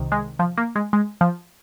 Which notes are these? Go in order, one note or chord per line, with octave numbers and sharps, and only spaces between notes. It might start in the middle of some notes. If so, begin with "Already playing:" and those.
Already playing: C2 C3 D#3
G#3
F3
A#3
G#3
G#3
F3